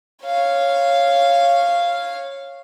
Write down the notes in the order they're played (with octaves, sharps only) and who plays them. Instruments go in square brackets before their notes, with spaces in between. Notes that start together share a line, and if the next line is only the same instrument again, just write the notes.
[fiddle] C#5 F5